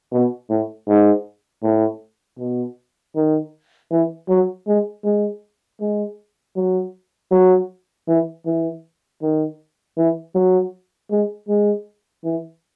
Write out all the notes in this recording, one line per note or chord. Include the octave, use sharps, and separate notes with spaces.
B2
A2
G#2
A2
B2
D#3
E3
F#3
G#3
G#3
G#3
F#3
F#3
E3
E3
D#3
E3
F#3
G#3
G#3
E3